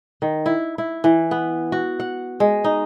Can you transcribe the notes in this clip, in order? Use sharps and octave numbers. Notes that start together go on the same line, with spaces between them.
D#3
E4
E4
E3
B3
F#4
F#5
G#3
D#4